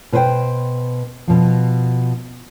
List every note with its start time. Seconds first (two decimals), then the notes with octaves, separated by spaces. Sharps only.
0.12 B2 B4 C5 D5 G5
1.28 B2 F3